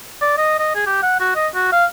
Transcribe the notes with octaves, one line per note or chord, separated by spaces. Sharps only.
D5
D#5
D#5
G#4
G4
F#5
F#4
D#5
F#4
F5